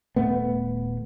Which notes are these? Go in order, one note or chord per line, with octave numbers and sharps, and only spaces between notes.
D#1 A3 B3